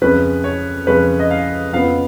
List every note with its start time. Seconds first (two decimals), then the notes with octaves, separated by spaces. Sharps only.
0.02 F2 C#3 G#3 C#4 B4
0.44 C#5
0.87 F2 C#3 G#3 C#4 B4
1.19 D#5
1.31 F5
1.73 F2 C#3 F3 B3 F5